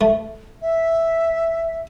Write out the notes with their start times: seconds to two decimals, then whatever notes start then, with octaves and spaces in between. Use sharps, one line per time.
0.01 A3
0.62 E5